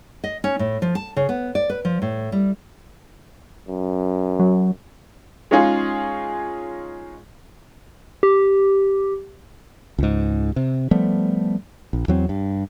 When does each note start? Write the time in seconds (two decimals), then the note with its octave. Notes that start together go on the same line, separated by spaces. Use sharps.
0.24 D#5
0.44 C#4
0.59 A2
0.82 F3
0.95 A5
1.16 C#3
1.29 B3
1.55 D5
1.70 B4
1.85 F3
2.02 A2
2.32 G3
3.68 F#2
4.40 F#3
5.51 G#3 C#4 D#4 F4 G#4
8.23 G4
9.98 C#2 G#2
10.56 C3
10.91 F3 G3 A3 B3
11.93 A#1
12.08 E2 F#3 C4
12.29 G2